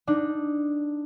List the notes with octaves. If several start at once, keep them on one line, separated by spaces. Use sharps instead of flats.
D4 D#4